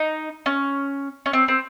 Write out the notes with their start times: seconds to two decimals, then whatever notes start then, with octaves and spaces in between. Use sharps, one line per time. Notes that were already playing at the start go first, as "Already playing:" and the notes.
Already playing: D#4
0.46 C#4
1.26 C#4
1.33 C4
1.48 C4